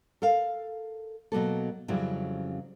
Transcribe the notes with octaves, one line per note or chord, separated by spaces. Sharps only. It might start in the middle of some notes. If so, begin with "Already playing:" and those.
A4 A#4 F5
B2 F#3 A#3 A4
F2 C#3 F#3 G3 E4